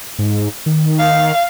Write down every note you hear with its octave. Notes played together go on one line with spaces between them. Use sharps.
G#2
D#3
F5